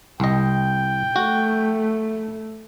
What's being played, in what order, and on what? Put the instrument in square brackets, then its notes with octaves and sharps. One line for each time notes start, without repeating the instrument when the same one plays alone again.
[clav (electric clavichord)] C2 D#5 [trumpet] G5
[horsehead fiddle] A3 [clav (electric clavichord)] F#4